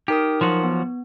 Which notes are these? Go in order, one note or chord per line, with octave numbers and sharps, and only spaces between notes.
D#4 G4 A#4 D#6
F3 F#3 F#4
B3